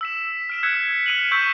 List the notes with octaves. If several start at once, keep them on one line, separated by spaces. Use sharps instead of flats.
E6 B6 E7
F6 D7 E7
E6 F#6 G#6 B6 C#7 E7
F6 D7 D#7 F7 F#7
C#6 E6 G6 B6 D7 E7